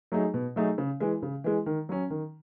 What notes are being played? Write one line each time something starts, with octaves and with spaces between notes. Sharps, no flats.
F#3 A3 D#4 G#4
B2
F#3 A3 D#4 G#4
C#3
E3 G#3
C#3
E3 G#3
D#3
F#3 C#4
D#3